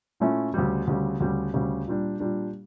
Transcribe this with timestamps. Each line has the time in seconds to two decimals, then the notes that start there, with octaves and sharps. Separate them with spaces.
0.20 A#2 A3 C#4 E4
0.54 D2 C#3 G3
0.87 D2 C#3 G3
1.20 D2 C#3 G3
1.54 D2 C#3 G3
1.87 A#2 G3 D4
2.20 A#2 G3 D4